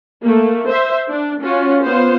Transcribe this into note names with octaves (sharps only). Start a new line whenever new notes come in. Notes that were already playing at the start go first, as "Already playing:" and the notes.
A3 A#3
C5 E5
D4
C#4 F4 F#4
B3 F4 C5